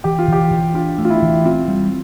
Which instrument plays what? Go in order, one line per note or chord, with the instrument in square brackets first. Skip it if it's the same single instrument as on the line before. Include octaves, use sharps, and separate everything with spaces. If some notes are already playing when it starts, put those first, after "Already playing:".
[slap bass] E3 [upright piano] G4
[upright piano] F4
[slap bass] E3 [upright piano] G4
[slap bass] E3
[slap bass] D4 [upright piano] F4
[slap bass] A3
[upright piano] F4
E4
[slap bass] E3
[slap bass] C4 [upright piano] F4
[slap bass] G3